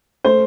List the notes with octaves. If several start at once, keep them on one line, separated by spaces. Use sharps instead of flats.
A3 C5